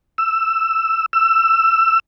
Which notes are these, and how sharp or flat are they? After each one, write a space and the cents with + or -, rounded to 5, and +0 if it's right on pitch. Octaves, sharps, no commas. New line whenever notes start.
E6 +10
E6 +20